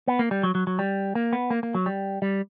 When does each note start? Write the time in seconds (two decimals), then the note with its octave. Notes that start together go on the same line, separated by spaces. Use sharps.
0.08 B3
0.19 A#3
0.31 G3
0.43 F#3
0.55 F#3
0.67 F#3
0.79 G3
1.15 A#3
1.33 B3
1.50 A#3
1.63 A#3
1.75 F#3
1.86 G3
2.22 G3